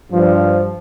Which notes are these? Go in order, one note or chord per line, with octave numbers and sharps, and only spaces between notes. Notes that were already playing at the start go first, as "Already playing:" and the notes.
G2 F3